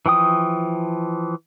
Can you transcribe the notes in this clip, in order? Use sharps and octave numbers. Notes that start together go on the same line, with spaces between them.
E3 F3 G5 D#6